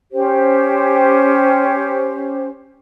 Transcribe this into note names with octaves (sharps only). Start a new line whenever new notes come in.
C#4 G4 C5